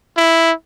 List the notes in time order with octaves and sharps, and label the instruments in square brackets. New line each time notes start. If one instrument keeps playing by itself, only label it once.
[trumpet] E4